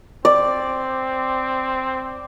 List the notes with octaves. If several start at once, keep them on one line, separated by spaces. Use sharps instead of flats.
C4 D5